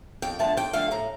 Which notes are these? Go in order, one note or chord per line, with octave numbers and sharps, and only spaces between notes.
F2 G5
D3 F3 A3 A5
F2 G5
D3 F3 A3 F5
A2 A#5